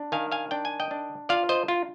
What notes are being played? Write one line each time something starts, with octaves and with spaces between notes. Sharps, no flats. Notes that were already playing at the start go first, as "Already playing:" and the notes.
Already playing: D4
D#3 F5 G#5
F5 G#5
D4 G5
G#5
D#5 G5
D4
F4 D5 F5
C5 D#5
F4